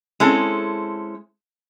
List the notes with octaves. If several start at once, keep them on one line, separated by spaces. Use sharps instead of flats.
G#3 C4 C#4 E4 A4